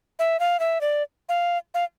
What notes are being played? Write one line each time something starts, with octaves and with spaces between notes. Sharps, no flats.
E5
F5
E5
D5
F5
F5